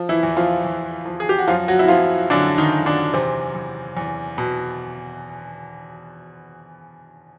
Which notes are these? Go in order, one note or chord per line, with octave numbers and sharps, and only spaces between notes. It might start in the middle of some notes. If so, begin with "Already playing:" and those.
Already playing: F3
E3 E4
E2
F3 F4
E2
F3
G#4
G4
F#4
F#2 F3 F4
F#3 F#4
E4
F3 F#3 F4
F#2 D3 D4
D#3 D#4
F#2
D3 D4
E2 C3 C4
E2
E2
B2